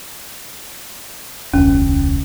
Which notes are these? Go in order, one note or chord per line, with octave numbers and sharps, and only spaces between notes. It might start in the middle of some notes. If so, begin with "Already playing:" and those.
E1 C#2 C#4